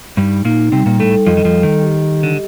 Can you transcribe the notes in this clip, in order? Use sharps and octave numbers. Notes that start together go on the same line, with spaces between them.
G2 G3 D#4
A#2 A#3 D#4
C3 G3 C4
A#2 A#3
A2 A3 A4
F2 F3 D#5
D#3
F2 F3
D#5
D#3
G4
G4
D3